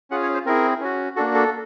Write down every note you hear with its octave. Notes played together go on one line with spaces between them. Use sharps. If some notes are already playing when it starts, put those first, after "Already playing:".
C#4 F4 G#4 F#5
C#5
C5
C4 E4 G#4 A#4
C#4 F#4
A#3 D4 F#4 A4
A4